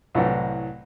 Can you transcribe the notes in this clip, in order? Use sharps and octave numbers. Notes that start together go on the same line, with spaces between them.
C2 A2 E3 F#3